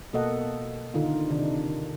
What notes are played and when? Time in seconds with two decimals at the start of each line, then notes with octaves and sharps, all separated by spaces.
0.13 B2 A#3 A4 D#5 F#5
0.94 D3 D#3 D#4 F4
1.30 C3 D#3 D4 D#4